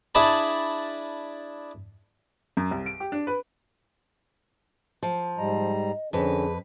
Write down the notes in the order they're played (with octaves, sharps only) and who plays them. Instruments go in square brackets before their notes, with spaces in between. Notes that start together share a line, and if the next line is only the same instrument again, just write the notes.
[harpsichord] D4 E4 G#4 D5 A5 B5
[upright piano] F#2
C2
D7
G4
D4
B4
[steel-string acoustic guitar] F3
[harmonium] G#2 G3 A#5 [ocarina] D#5
[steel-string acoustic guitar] F2 B4 [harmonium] D3 C#4 [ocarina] G#4